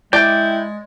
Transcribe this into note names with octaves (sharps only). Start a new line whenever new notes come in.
G#3 E4 D5 G5